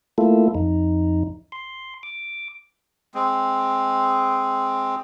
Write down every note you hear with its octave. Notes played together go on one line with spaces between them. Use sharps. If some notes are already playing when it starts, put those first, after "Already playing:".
A3 A#3 E4 F4 A4
F2 D#4
C6
D6
G#3 C4